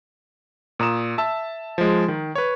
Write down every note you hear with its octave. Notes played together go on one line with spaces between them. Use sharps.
A#2 A#5 D#6 E7
E5 A5 E6
F3 G#3
D#3
B4 C#5